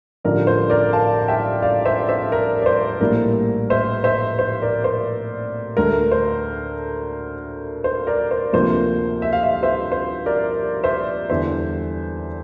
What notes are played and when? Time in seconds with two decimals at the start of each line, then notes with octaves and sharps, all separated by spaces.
0.24 A1 G2 D3 F3 A#4 D5
0.47 C5
0.70 A#4 D5
0.93 F5 A5
1.28 E5 G5
1.62 D5 F5
1.85 C5 E5
2.09 C5 E5
2.32 A#4
2.62 D5
2.66 C5
3.01 A#1 A2 G3 A#3 A#4
3.70 C5 E5
4.04 C5 E5
4.39 C5
4.62 A#4 D5
4.84 C5
5.77 D2 D3 A3 A#4
6.11 C5
7.84 C5
8.07 A#4 D5
8.31 C5
8.53 D2 C3 F3 A#3 C5
9.22 E5
9.33 F5
9.43 E5
9.53 F5
9.63 C5 E5
9.92 C5
10.26 A#4 D5
10.83 C5 E5
11.30 E2 D3 G3 C5 E5